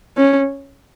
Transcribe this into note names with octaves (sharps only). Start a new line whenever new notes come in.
C#4